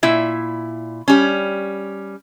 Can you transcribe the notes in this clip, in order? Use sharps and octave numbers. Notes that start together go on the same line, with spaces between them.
A#2 E4 E5
G3 C#4